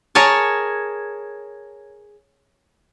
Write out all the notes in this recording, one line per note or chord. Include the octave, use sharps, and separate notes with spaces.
G#4 A#4 C#5 G#5 A5